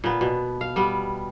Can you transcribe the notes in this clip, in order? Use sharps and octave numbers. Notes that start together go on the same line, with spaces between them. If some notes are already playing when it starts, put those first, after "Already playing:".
A#2 B3
B2
F5
G3 B3